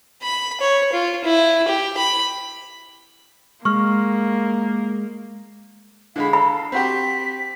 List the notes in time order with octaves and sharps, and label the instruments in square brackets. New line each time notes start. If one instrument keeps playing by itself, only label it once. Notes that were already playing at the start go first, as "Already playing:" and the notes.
[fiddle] B5
C#5
F4
E4
G4
B5
[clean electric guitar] G#3 [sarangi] A#3 [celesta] C#6 F6
[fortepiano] D3 G#3 B5 [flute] F5
[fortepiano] A4 [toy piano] B5
[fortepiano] C4 F#4 G4 [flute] B6